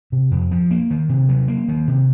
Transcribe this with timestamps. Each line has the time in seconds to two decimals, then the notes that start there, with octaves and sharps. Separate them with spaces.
0.12 C3
0.31 F2
0.51 F3
0.71 A#3
0.90 D#3
1.09 C3
1.29 F#3
1.48 A#3
1.68 D#3
1.88 C3